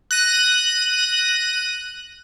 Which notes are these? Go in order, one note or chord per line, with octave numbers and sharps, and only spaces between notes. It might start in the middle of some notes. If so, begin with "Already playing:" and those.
F#6 A#6 D#7